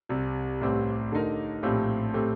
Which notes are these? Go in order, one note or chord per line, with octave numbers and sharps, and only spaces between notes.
C2 C3 G3
A1 A2 G3 C4 G4
D3 A3 D#4 A#4
A#1 A2 F3 C4 G4
A2 A3 C4 G4